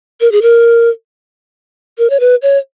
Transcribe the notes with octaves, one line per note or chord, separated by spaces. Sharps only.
A#4
G#4
A#4
A#4
C#5
B4
C#5